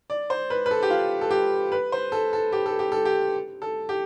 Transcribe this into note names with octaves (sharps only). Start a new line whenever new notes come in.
D5
C5
B4
B4
A4
G4
F4
A4
G4
B4
C5
A4
A4
G4
A4
G4
A4
G4
A4
G4